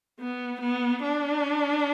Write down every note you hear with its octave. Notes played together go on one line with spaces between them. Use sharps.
B3
B3
D4